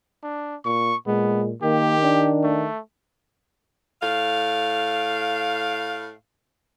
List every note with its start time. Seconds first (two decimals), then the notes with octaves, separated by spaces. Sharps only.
0.23 D4
0.65 A#2 C#6
1.07 A#2 G#3 B3
1.62 D#3 A#3 G4
2.03 D4
2.44 A3
4.01 A2 F5